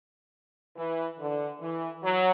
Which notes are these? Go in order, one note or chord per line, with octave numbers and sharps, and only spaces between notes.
E3
D3
E3
F#3